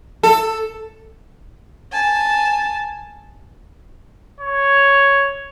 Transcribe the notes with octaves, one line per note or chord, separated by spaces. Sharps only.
A4
G#5 A5
C#5